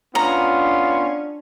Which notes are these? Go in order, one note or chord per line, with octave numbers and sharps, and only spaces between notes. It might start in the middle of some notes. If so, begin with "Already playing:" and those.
B3 C#4 D4 F4 A#5